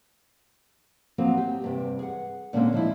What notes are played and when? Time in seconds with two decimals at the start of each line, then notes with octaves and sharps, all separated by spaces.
1.18 F3 F#3 A#3 C4
1.37 G4
1.62 E2 G2 C3
1.99 G#4 F#5
2.53 A#2 D3 G#3 A#3 C4 C#4
2.73 D#3 F3 D4 E4